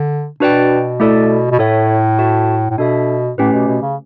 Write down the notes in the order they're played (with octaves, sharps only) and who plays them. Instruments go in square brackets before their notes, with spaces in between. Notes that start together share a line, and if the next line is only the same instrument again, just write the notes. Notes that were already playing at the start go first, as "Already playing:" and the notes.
Already playing: [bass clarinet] D3
[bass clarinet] B2 [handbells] D4 F#4 B4 D5 G5
[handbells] A3 E4 A4 D5
[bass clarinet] B2
[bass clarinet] A2 [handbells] E4 A4 C#5 E5
[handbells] F#4 A4 E5 A5
[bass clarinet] A2
[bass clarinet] B2 [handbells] D4 A4 E5
[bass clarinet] A2 [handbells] A3 C#4 G4 B4
[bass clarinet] B2
B2
C#3